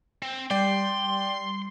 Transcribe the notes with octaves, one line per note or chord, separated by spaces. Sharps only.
C4
G3 D5 G5 C6